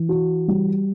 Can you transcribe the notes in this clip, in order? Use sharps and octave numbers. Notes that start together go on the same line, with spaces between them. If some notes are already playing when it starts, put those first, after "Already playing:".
Already playing: E3
F#4
G3